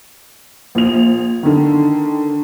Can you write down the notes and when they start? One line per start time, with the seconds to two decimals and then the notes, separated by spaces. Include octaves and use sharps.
0.75 A#1 F7
1.43 D3 D#3